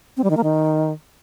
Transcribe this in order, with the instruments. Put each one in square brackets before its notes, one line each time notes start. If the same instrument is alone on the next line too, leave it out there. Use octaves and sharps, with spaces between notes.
[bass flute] C4
G3
D#3
A#3
D#3